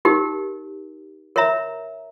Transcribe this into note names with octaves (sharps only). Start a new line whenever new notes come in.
D#4 G4 A#4
A#4 C#5 E5 A#5